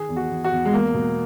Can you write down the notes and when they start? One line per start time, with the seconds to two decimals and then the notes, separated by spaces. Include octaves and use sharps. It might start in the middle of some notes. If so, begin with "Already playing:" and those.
Already playing: D#3 G#4
0.09 E2
0.16 F#4
0.30 E2
0.44 F#4
0.52 E2
0.65 G#3
0.73 E2 A#3
0.94 B2